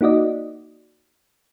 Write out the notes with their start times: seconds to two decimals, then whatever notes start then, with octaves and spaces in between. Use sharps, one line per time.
0.01 A#3 D#4 F#4 D5 D#5